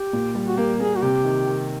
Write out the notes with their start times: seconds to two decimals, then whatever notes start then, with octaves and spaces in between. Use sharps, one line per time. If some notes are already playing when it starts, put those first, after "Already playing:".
Already playing: G4
0.13 A#2
0.35 G3
0.48 F#4
0.57 A#3 G4
0.80 A#3 G#4
0.96 F#4
1.02 C3 G4
1.25 D#3
1.47 D#3